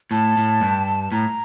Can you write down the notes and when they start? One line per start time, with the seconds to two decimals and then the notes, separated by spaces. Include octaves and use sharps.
0.11 A2 A5
0.37 A2
0.61 G2
1.12 A2 A#5